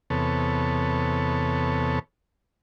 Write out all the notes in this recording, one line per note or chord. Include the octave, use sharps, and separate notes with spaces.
E2 C3 B3 A4 C#5